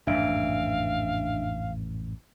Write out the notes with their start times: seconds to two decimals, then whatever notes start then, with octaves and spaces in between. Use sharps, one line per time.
0.07 A1 F2 G#2 D4 E5 F5 D7